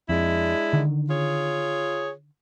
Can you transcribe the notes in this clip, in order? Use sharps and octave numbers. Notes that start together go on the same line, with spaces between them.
F2 G#3 D4 E4
D3 D#3
F4 G#4 C#5